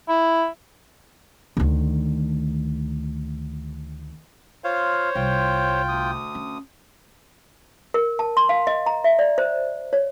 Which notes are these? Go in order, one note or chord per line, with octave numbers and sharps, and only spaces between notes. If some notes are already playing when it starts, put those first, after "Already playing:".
E4
D2 D#3
F4 C5 C#5 F5
C2 F4 G5
D2 D#6
C#4
A#4
A5
C6
F5
D#5
A#5
E5
D5
C5
C#5